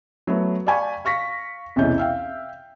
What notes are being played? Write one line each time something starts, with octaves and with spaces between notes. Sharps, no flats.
F#3 A3 B3
D5 F5 G5 G#5 B5 C#6
F5 C#6 A#6 B6
B1 E2 C3 E3 C#4 G6
E5 F5 G5